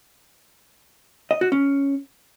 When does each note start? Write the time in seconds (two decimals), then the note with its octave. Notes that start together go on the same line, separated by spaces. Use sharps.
1.31 D#5
1.41 F#4
1.52 C#4